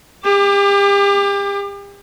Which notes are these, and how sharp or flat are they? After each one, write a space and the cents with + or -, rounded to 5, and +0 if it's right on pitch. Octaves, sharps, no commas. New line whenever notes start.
G4 +35 D6 +25